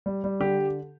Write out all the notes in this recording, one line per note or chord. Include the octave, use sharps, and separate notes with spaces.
G3
G3
D3 G4